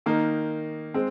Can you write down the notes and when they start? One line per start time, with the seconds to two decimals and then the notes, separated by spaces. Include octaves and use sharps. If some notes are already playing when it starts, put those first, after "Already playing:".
0.06 D#3 A#3 D#4
0.94 G#3 C4